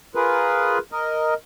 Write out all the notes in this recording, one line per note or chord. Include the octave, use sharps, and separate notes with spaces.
F4 G#4 A#4 B4
A#4 D#5